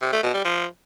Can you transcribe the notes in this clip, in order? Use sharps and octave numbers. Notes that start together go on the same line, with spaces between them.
C3
A3
B2
G3
F3